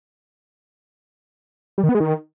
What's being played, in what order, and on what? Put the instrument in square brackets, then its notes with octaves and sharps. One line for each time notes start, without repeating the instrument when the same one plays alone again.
[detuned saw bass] G3
D#3
B3
G#3
D#3